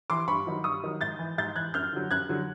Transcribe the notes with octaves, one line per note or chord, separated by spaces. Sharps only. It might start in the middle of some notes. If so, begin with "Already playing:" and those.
E3 C6 D6
G2 B5 C#6
D#3 F#3
G2 C#6 D#6
D#3 F#3
G#2 G6 A6
E3
G#2 G6 A6
E3 F#6 G#6
F#2 F6 G6
D3 F#3
F#2 F#6 G#6
D3 F#3